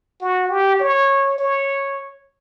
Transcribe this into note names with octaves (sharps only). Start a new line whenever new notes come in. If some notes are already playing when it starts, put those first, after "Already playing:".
F#4
G4
C#5
C#5